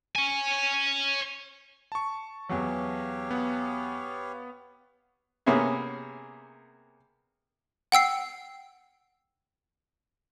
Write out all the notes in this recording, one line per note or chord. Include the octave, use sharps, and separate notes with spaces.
C#5 G#5
A5 C#6
E2 F#3 G4 C#5 F5
B3 F#5
C3 A#3 B3 C#4 G#4
F#5 G5 E6 C7